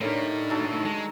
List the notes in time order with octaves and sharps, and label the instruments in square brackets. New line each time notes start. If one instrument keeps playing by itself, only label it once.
[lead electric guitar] A2 A3 [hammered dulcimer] D3 G3 [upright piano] D4 A#4 C#5 [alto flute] D#4
[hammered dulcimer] D#3 F#3 A5
[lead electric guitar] G#3 [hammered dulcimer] A5